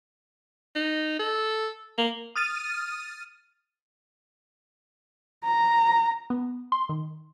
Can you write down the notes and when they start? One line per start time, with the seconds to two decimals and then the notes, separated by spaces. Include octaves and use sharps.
0.76 D#4
1.19 A4
1.98 A#3
2.36 D#6 F6 A6 D#7
5.44 A#5
6.30 B3
6.72 C6
6.89 D#3